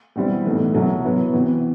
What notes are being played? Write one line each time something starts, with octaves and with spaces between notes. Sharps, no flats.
E2 B2 G3 C4 E4
B1 A2 E3
C2 B2 F#3
B2 F#3 B3 E4
E2 C3 E3